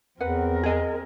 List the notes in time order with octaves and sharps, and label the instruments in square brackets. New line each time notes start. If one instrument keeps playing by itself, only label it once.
[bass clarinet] E2 [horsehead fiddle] C4 A#4 [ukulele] B4 F#5
[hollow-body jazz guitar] G#4 D#5